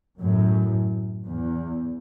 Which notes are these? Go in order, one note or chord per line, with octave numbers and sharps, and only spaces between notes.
F#2 A2
E2